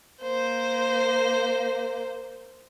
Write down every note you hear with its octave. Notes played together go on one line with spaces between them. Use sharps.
A#3 C5